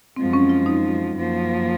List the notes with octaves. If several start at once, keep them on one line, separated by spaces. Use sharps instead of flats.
F#2 F3 G#3 C4
C#4
F4
D#4
F#2 F3 A#3